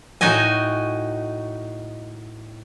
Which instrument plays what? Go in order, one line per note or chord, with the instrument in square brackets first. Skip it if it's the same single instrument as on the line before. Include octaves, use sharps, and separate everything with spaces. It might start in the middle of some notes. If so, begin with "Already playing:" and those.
[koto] A2 D#4 F#4 D#5 G#5